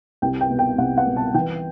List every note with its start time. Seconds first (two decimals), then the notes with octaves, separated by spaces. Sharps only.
0.22 C2 G5
0.41 G5
0.50 B2
0.59 G5
0.78 C2 F#5
0.98 F#5
1.07 B2
1.16 A5
1.34 E3 G5